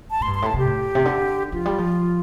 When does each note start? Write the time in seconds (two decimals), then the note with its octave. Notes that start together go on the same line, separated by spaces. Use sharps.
0.11 A5
0.20 A2 C6
0.27 G2
0.34 C6
0.42 A2 A5
0.54 C3 G4
0.65 A2
0.95 C3
1.05 D3
1.52 F3 F4
1.66 G3
1.78 F3